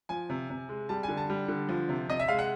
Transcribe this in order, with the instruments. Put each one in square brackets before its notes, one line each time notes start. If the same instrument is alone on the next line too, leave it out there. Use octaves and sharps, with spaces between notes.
[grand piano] F3 G#5
C3
C3
G#3
G3 A5
G#5
D3
A5
G3
D3
F3
C3
C3 D#5
E5
G#3 F5
F#5